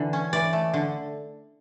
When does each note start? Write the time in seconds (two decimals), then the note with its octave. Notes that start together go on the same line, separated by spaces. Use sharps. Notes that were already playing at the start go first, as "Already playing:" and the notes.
Already playing: D3 E3
0.13 C#4
0.33 E3 D5
0.53 A3
0.74 D3